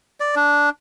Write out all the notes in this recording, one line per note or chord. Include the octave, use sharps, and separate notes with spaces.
D5
D4